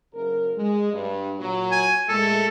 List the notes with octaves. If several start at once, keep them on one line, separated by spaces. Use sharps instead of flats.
F#1 A#4
G#3
G2
A#2 F#3
G#5
A#2 G#3 A3 A4